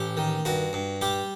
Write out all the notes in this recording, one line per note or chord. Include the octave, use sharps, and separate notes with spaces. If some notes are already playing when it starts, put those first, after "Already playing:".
Already playing: A1 G4
D#3
G2 F#4
G2
G3 G4